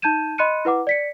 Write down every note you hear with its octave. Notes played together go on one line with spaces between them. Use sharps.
D#4 A5 G6 G#6 D#7 E7
D#5 B5 C6 F#6 C#7 D#7
E4 B4 F#5 D6
D5 B6 C#7